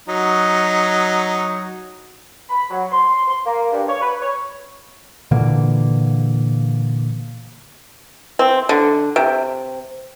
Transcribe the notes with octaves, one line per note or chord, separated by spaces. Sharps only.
F#3 D#4
B5
F#3
C6
C6
A#3
G2
C#5
B4
C#5
A#2 D3 E3 A#3
C4
D3
C3